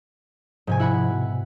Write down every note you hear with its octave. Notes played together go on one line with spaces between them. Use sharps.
G#2 C3 F3 G#5
E4 F#5 B5
B2